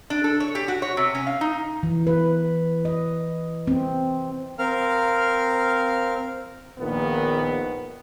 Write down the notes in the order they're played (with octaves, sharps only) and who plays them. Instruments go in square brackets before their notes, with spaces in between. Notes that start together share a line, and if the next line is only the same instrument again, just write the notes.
[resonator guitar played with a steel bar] D4
A4
C#5
G4
F#4
C#5
C3
C#4
F5
D#4
[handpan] E3
B4
D#5
C4
[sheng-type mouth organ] C4 A#4 F5 F6
[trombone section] A#1 A#2 D#3 B3